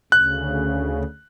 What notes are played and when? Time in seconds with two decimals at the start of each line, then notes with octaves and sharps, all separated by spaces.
0.12 D2 C#3 F#6